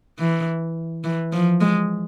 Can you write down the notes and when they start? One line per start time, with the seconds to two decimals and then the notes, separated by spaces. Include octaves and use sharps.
0.19 E3
1.04 E3
1.33 F3
1.61 G#3